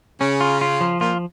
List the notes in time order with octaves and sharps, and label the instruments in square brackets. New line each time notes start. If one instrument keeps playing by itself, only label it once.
[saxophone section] C#3 [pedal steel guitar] C#4
[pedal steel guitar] F4
F4
F3
[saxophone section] A#2 [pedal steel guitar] F4